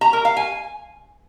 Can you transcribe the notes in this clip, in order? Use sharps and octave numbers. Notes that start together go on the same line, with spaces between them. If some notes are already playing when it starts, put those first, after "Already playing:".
A#5
A#4
F5
G#5